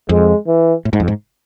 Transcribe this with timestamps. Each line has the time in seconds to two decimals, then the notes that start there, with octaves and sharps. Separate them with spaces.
0.09 F2 G#3
0.47 E3
0.85 A2
0.93 G#2
1.00 F2
1.08 G#2